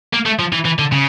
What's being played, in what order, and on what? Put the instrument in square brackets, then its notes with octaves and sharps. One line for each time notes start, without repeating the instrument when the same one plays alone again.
[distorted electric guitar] A#3
A3
F3
E3
E3
D3
C#3